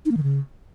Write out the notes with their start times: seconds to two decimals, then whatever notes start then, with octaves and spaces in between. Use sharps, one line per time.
0.05 D#4
0.11 A#3
0.17 D#3
0.23 C#3